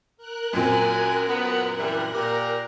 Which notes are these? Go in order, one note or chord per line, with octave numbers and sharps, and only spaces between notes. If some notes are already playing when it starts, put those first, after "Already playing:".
A#4 F#6
F#2 A#2 C4 G#5
B3
E3 G3
A#2 G4 A#5